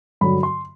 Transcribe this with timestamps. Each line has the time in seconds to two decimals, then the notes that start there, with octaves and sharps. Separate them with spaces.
0.21 G2 D3 F#3 B5
0.43 C6